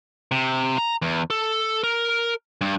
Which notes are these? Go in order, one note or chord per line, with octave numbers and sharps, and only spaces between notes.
C3
A#5
E2
A4
A#4
G2